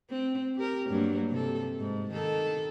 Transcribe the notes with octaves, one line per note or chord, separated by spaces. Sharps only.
C4
G4 A#4
G2 F#3 A#3
C3 A4
G#2
D#3 A4